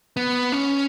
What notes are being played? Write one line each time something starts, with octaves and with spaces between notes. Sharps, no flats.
B3
C#4